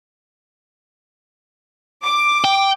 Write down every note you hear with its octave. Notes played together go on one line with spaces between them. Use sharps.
D6
G5